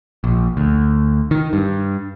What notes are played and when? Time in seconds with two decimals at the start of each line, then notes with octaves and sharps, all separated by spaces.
0.24 A#1
0.57 D2
1.31 D#3
1.53 G2